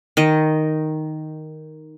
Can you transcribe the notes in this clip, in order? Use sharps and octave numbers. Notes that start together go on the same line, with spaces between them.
D#3 D#5